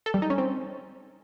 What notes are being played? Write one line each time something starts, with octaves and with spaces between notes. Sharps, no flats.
A4
G3
D#4
C#4
C4